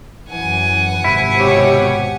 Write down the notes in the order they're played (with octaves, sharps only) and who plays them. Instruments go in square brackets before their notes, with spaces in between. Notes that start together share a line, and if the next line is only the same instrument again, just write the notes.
[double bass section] F#2 E3 [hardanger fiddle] F#5 G#5
[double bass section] G#1 C3 [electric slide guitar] E4
[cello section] B2 G4 C#5